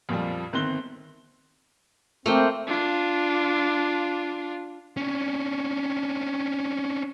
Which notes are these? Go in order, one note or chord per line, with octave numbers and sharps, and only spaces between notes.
F2 A#2 F3 G3
G1 D#3 C4 C6 F#6 G7
A3 A#3 C4 A#4 C5
D4 F4
C#4 D4